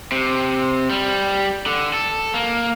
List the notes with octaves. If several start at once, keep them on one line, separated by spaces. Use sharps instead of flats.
C3
G3
D3
A4
A#3